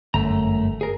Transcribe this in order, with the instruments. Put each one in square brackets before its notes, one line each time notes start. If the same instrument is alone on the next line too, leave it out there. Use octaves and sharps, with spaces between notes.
[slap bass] G1 [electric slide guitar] F#2 A3 A#5
[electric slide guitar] G#4 A#4